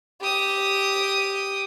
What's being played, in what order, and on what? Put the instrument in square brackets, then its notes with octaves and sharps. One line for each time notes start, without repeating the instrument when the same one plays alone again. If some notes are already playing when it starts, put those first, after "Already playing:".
[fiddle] G4 D#6